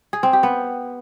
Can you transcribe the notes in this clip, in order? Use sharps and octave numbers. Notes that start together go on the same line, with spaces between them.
G#4
C4
G4
B3